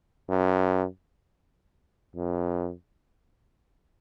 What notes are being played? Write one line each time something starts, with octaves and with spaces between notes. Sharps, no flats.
F#2
F2